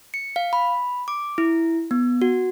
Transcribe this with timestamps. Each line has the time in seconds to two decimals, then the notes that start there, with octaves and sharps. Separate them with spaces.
0.14 C#7
0.36 F5
0.53 B5
1.08 D6
1.38 E4
1.91 B3
2.22 F#4